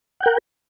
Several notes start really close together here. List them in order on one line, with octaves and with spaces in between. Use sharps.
F#5 G5 A#4